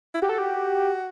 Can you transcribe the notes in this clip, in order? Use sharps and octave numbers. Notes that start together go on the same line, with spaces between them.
E4
F#4 G4
A4
G4